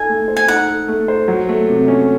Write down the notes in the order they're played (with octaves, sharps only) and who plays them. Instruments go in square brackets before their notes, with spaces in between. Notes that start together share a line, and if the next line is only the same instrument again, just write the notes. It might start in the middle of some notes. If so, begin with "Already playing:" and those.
Already playing: [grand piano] D#4 A4 [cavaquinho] G#5
[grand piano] A3
C5
[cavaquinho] G#5
[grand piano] D#4 [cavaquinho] F#5
[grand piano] A4
A3
C5
F#3
A3
C3
C#4